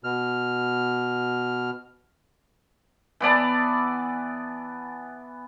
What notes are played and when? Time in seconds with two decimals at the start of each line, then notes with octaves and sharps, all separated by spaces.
0.04 B2 F6
3.20 E3 B3 D5 A5